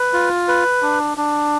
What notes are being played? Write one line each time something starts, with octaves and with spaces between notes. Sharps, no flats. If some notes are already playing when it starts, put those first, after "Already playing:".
Already playing: B4
F4
B4
D4
D4